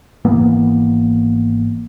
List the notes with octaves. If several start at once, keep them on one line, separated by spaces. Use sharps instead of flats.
G#1 E3 A#3 B3